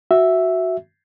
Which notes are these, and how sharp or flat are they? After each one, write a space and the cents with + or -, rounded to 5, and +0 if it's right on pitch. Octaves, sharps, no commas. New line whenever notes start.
F#4 +0 E5 +0